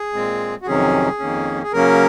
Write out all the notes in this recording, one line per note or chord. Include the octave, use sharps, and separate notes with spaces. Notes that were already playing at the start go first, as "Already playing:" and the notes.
Already playing: G#4
A#2 G#3 C4
F#4
F2 C3 D#3 F#3 C#4 G#4
F2 D#3 A#3 C#4
G#4
C#3 F#3 A#3 C#4 A#4